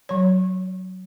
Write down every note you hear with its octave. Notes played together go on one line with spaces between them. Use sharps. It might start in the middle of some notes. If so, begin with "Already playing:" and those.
F#3 C#5